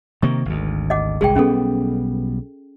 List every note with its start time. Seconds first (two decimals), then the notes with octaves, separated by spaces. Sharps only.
0.22 C3 D#3 A#3 C#6
0.45 G#1 D2
0.90 D#5 F#5 D6
1.21 G1 C2 G#3 G#4 G5
1.36 B1 G3 B3 C#4 G#4 A4